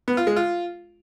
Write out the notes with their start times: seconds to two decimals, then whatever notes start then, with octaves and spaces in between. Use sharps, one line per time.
0.08 B3
0.17 F4
0.27 G#3
0.36 F4